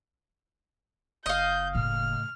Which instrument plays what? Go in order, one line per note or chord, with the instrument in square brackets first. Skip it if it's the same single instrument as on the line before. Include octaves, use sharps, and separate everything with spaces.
[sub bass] F#1 [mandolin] D#5 F5 [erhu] G6
[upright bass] A2 C#3 [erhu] F6